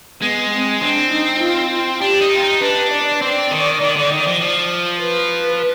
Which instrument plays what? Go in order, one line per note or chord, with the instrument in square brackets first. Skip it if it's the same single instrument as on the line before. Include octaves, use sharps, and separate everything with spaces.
[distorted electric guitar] G#3 [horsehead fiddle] B3
[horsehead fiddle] C4
[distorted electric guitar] C4 [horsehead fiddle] D4
[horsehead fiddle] D#4
F4
[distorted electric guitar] D4 [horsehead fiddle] G4
[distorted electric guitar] D#4
F4
D#4
[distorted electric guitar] D4 [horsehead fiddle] B4
[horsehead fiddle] D5
[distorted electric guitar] C4 [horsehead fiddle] D5
[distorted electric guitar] D#3
D#3
D3
D#3
F3
F3
[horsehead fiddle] B4